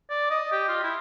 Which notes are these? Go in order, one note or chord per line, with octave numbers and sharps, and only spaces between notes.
D5
D#5
G4
F4
E4